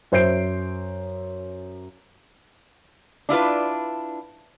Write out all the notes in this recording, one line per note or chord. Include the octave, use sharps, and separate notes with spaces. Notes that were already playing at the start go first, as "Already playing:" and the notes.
F#2 C5 E5 G6 C7 D7
D4 E4 F4 B4